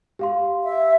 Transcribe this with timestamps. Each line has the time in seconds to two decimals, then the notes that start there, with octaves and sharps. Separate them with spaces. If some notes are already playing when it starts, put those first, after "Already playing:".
0.19 G4 F5 C6
0.64 E5